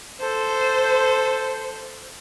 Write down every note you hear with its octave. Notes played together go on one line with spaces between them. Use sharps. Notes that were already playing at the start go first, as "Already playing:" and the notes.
A4 C5